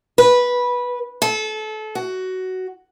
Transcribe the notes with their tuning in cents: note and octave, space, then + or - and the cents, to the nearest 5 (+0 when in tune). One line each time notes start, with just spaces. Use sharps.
B4 -15
A4 -30
F#4 +10